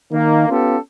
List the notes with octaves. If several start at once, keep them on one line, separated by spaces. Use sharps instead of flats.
D#3 A#3
B3 C#4 F4 G4 A4